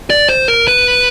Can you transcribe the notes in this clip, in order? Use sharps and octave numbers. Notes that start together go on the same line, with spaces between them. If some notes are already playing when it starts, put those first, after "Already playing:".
D5
C5
A#4
B4